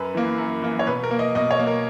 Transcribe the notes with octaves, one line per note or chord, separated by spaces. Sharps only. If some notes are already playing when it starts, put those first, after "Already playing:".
Already playing: F#2 B4
E3 A#3
F#2
E3 A#3
C#5
B2 B4
A#4
A#3
D#5
B2 D#5
C#5
A#3
A#4